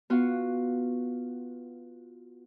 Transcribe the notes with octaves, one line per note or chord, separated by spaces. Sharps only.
B3 F4 F#4